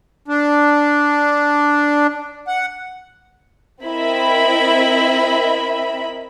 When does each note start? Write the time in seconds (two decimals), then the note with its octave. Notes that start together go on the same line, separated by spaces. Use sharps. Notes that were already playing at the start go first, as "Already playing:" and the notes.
0.28 D4
2.48 F#5
3.83 C4 E4 A#4 D#5 E5 B5